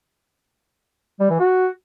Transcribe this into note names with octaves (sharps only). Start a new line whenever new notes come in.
G3
E3
F#4